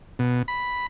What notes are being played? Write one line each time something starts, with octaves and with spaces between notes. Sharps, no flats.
B2
B5